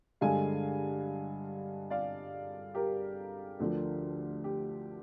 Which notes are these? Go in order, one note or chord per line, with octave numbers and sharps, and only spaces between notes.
G2 D3 G#3 F5 G#5
D5 F5
G4 A#4
D2 D3 F3
G4